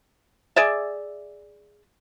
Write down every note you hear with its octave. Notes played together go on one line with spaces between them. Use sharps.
G#4 D5 E5